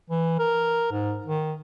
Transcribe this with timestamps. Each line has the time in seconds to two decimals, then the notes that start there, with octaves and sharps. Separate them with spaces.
0.10 E3
0.39 A#4
0.92 G#2
1.26 D#3